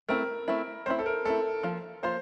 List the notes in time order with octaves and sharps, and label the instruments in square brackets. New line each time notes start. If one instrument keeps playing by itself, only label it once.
[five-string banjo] A3 C4 E4 [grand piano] A#4
[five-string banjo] A3 C4 E4
[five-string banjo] A3 C4 E4 [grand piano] C5
[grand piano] A4
A#4
[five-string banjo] A3 C4 E4 [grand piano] A4
[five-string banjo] F3 A#3 F4
[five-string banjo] F3 A#3 F4 [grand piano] C5